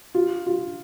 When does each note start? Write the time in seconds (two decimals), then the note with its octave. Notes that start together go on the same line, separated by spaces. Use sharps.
0.15 F4
0.46 F4